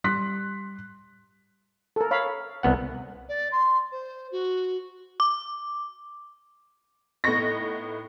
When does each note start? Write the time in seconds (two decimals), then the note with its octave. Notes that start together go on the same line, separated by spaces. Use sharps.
0.04 G3 C6 F#6 B6
1.96 A4 A#4
2.11 C#5 F5 B5
2.63 C2 B3 F#5
3.29 D5
3.52 C6
3.91 C5
4.31 F#4
5.20 D6
7.24 A2 B3 D#4 C#6 A#6